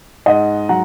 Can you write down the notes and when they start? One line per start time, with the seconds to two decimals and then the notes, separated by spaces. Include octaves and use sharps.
0.26 G#2 D#5 F#5
0.69 F#3 F#5 A#5